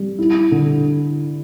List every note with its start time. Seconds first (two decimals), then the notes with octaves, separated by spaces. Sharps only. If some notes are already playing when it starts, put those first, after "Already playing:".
Already playing: G3
0.19 E4
0.51 D3